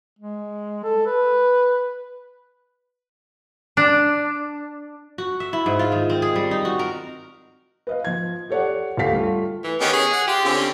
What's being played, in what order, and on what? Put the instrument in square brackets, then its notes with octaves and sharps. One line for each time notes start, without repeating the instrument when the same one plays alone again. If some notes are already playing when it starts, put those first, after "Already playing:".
[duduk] G#3
A4
B4
[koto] D4
[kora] F#4
E5
E4
G#2
F4
D#3
C4
G#4
G3
D#4
F#4
A#4
[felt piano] B4 D#5 F5
F3 G#6
G4 A4 C#5 D5 F#5
D2 A3 G4 F5 B6
G3 A3 F4
[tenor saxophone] E3
[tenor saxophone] D#3 [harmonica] B3 C#4 G4
[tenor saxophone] G#4 [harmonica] C#5
[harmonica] F#5
[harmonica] F4 C6 [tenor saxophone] G4
[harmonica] D3 C4 C#4